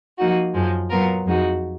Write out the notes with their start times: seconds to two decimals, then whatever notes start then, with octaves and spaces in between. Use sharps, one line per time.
0.18 F3 A#3 D#4 F#4
0.54 F#2 F3 G#3
0.89 A#2 F#3 B3 F4 A#4
1.25 F2 F3 G#3 D#4 F#4